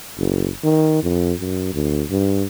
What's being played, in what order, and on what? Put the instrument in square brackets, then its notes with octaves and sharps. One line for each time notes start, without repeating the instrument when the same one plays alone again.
[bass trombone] F#1
D#3
F2
F#2
D2
G2